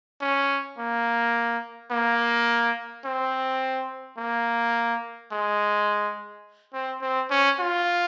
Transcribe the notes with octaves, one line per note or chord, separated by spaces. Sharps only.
C#4
A#3
A#3
C4
A#3
G#3
C4
C4
C#4
F4